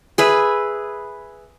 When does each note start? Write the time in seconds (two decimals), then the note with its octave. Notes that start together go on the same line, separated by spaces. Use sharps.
0.18 G#4 B4 E5